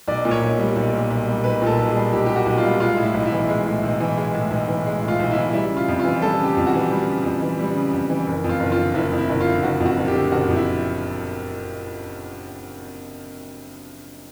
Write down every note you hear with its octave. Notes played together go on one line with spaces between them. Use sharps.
B1 D5
A#2
C#5
B1
G3
B1
A#2
B1
G3
B1 B4
A#2 A4
B1
G3 G#4
B1 G4
A#2 G4
F#4
B1
F4
G3
G#3 F4
A2
E4
B1
E4
E3
G#3
A2
B1
E3
G#3
A2
B1
E3
G#3
A2
F4
B1
E3 E4
G3 E4
C#3
F4
F2
F4
E3
G3 A4
C#3
G4
F2
F#4
E3
G3
C#3
F2
E3
G3
C#3
F2
E3
F#1
F2
F4
F#1
F4
D3
F#1 E4
F2
E4
F#1
F4
D3
F#1 F#4
F2
F#4
F#1
G4
D3
F#1 F#4
F2
E4